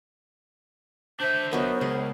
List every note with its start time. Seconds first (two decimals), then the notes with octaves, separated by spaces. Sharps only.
1.20 D4 C5 E5 G6
1.52 F#3 B3 A#4 D#5
1.81 C#2 G#4